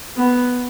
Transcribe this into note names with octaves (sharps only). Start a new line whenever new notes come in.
B3